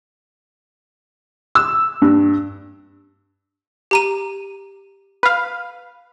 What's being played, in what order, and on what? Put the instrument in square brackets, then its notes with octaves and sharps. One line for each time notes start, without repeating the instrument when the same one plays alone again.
[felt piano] E6
G2
[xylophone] G4 A#5 D#7
[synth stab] B4 F5